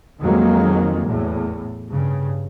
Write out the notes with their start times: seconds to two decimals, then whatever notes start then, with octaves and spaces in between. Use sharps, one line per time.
0.20 F2 D#3 F#3 G#3 A#3
1.06 E2 A2
1.88 G2 C#3